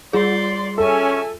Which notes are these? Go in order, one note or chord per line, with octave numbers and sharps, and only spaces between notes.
G3 F4 G#4 D5 C6
C#4 A4 E5 G#5